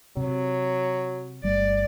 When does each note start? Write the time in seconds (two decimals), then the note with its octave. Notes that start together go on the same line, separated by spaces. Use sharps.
0.17 C3 F#3
1.44 G1 G3 A3 D5